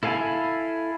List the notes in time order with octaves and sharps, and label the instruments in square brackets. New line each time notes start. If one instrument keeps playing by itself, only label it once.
[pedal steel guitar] E4 A4 F5 G#5 B5